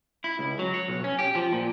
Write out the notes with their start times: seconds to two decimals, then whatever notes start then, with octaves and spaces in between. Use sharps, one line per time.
0.24 E4
0.39 C#2
0.59 F#3
0.74 C#5
0.88 B1
1.04 C#4
1.19 G4
1.35 F3
1.53 A#2